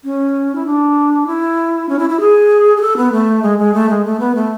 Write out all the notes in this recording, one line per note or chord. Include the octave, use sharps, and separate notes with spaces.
C#4
E4
D4
E4
C#4
E4
E4
G#4
G#4
A4
B3
A3
G#3
G#3
A3
G#3
A3
B3
A3